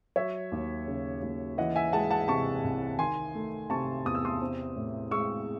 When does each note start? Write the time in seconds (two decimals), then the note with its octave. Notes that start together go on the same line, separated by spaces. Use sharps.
0.16 F#3 C#5 E5
0.52 D#2
0.87 C#3
1.22 D#2
1.58 E3 D#5 F#5
1.76 E5 G#5
1.92 G#3 F#5 A5
2.11 F#5 A5
2.28 C3 A5 C#6
2.64 C2
2.99 D#3 G#5 C6
3.35 A3
3.70 C3 A5 C#6
4.05 E2 D#6
4.15 E6
4.25 C6 D#6
4.42 C4
4.76 A2
5.11 G#3 C#6 E6